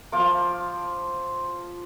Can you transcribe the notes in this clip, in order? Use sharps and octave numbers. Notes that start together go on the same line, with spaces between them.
F3 F4 D6